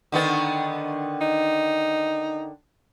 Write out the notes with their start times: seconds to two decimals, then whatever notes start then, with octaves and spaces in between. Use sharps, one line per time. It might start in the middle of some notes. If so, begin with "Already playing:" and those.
0.12 D3 D#3 B3
1.21 D#4